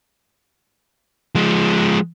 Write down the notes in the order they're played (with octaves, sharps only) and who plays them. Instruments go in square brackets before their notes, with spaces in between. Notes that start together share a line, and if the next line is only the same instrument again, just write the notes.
[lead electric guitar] F3 G#3